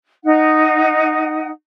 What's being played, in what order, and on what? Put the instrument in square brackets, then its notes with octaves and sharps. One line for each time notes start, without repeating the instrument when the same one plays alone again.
[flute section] D#4 F#5